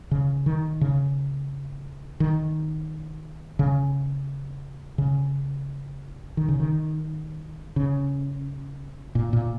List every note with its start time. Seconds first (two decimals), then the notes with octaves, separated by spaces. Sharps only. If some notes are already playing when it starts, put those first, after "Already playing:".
0.11 C#3
0.46 D#3
0.81 C#3
2.20 D#3
3.59 C#3
4.98 C#3
6.37 D#3
6.48 C#3
6.60 D#3
7.76 C#3
9.15 A#2
9.33 A#2